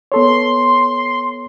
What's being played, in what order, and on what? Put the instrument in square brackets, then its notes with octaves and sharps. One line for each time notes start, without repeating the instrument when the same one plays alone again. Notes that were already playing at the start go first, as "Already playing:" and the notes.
[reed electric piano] B3 A4 C#5 [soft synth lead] C6